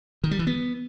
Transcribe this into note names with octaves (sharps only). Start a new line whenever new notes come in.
D#3
G3
E3
B3